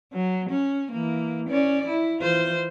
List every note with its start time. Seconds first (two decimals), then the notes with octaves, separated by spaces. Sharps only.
0.13 F#3
0.50 C#4
0.92 E3 A#3
1.49 C#4 D5
1.87 E4
2.21 E3 F4 C5